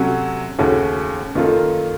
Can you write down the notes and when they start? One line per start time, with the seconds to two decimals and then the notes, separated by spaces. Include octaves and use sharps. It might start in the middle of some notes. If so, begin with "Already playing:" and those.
Already playing: C3 F#3 A3 C#4
0.59 D#2 C#3 A3 C#4 F#4
1.35 F#2 D#3 A#3 F4 A4